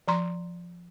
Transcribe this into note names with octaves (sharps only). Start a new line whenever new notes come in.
F3 A#5 C6